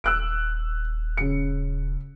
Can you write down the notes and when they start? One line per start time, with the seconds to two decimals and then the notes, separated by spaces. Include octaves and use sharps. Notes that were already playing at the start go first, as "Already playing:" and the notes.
0.04 D#1 E6 F#6 D7
1.17 C#3 C#7